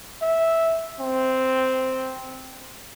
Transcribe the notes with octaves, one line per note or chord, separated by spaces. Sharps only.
E5
C4